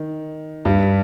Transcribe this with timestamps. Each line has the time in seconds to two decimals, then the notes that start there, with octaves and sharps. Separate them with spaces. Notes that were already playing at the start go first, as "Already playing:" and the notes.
Already playing: D#3
0.65 G2 G3